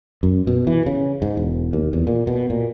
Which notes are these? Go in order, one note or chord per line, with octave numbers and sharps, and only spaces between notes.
F#2
B2
E3
C#3
G#2
E1
D#2
E2
A#2
B2
A#2